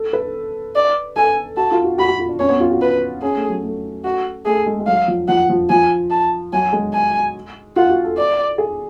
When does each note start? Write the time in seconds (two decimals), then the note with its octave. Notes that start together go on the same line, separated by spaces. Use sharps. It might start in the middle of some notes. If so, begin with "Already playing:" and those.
Already playing: A4
0.13 B4
0.75 D5
1.16 A4 G#5
1.57 F#4 A5
1.72 F4
1.84 F#4
1.98 F#4 B5
2.08 F#4
2.19 F4
2.29 D4
2.39 C#4 C#5
2.50 B3
2.60 F4
2.71 F#4
2.82 B4
3.22 C#4 G#4
3.36 A3
3.49 F#3
3.64 A3
4.04 F#4
4.45 A3 G#4
4.66 G#3
4.80 G#3
4.87 F#3 F5
5.08 F3
5.28 F3 F#5
5.49 F3
5.70 F3 G#5
6.10 A5
6.53 F#3 G#5
6.73 G#3
6.93 G#5
7.76 F4 F#5
7.89 F#4
8.04 A4
8.17 D5
8.58 G#4